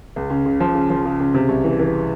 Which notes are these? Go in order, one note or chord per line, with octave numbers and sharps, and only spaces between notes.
C#2
C#3
C#3
F3
C#3
F3
C#3
C#3
C3
C2
E3
E3